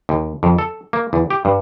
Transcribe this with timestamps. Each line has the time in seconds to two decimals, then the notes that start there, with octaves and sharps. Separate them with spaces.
0.09 D#2
0.43 F2
0.58 A4
0.93 A#3
1.13 E2
1.30 G4
1.45 G2